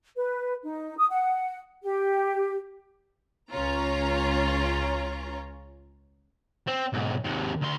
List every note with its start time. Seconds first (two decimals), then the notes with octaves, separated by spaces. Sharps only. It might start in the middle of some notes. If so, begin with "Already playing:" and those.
0.17 B4
0.64 D#4
0.98 D#6
1.10 F#5
1.83 G4
3.51 C#2 C#4 F4 C#5 A#5
6.67 C4
6.93 B1 G#2
7.24 D#2 C3
7.62 D2 C6